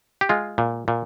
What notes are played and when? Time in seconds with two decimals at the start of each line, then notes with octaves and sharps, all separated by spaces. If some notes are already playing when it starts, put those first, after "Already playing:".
0.21 G4
0.29 G#3 F4
0.58 A#2
0.88 A#2